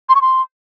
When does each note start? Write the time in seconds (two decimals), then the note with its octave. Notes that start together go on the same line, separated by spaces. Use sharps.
0.09 C6
0.15 C#6
0.21 C6